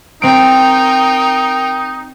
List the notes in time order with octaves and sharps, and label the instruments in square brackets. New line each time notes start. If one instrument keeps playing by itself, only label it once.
[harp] C4 D7 [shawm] D#4 [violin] A#4 G5